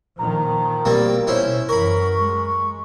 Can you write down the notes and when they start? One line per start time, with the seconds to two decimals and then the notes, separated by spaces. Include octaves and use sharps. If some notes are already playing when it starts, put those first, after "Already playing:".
0.19 A#2 D#3 F3 A#5
0.85 B2 G3 A#3 C4
1.27 A#2 C#4 E4 C5
1.69 F#2 E3 A#4 B5 C#6
2.17 G#3